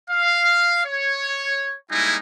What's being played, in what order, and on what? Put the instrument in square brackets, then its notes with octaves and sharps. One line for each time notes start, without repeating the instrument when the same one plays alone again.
[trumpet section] F5
C#5
G3 G#3 A#3 D#4 E4 G#5